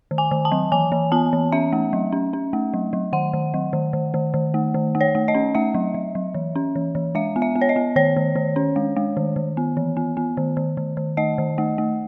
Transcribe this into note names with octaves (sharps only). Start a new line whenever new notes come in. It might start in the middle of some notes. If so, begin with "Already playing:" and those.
D#3
G#5
D#3
A5
F#3
E3 G#5
E3
B3 A5
E3
C#4 E5
A3
F#3
C#4
C#4
A3
F#3
F#3
D#3 F#5
D#3
F#3
D#3
D#3
D#3
D#3
A3
D#3
A3
C#5
A3
D#5
C#4
A3 E5
F#3
F#3
F#3
E3
C#4
E3
E3
G#3 E5
B3
E5
B3
C#5
D#5
B3
D#3 C#5
D#3
D#3
C#4
G#3
G#3
D#3
D#3
B3
E3
B3
B3
D#3
D#3
D#3
D#3
A3 D#5
D#3
A3
A3